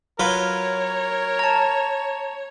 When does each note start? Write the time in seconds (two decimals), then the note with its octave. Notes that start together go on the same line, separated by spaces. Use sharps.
0.20 F#3 F4 A#4 B4 C#5
1.39 A5 A#5